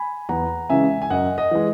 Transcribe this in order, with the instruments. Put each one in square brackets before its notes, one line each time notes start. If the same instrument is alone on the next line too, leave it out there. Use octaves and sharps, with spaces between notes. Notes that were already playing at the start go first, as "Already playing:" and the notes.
Already playing: [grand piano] G#5 B5
E2 F#5 A#5
C#3 E3 G#3 C#4 E5 G#5
G#5
F#2 D#5 F#5
D#5
E3 G#3